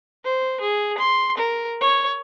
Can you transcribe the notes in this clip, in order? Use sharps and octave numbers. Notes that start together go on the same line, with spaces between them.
C5
G#4
C6
A#4
C#5